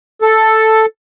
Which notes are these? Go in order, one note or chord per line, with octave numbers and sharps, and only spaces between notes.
A4